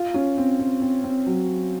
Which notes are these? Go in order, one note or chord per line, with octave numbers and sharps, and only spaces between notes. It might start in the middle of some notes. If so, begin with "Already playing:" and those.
Already playing: F4
C#4
C4
C4
C4
C4
F#3